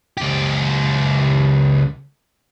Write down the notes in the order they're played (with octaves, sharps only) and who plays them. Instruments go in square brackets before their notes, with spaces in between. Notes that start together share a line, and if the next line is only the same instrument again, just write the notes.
[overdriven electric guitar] C#2 G4